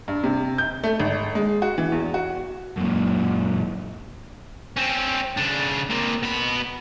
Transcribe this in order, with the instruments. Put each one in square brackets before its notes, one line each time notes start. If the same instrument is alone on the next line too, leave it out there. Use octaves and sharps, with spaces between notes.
[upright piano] G2
C3
G6
A3
G#1
G#3
F#4
E3
E2
F#4
[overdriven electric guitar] F#2 A#2
[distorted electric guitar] C4 C#4
C#3 D4
A#3 C4
B2 B5